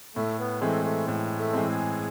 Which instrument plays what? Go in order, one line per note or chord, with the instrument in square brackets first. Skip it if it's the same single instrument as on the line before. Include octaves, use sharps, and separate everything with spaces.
[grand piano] A2 [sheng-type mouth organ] A3
[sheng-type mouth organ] B3
[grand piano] E3 G#3 C4 [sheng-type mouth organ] A3
[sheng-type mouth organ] A3
[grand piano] A2
[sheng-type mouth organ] A3
[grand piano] E3 G#3 C4
[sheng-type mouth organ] G#4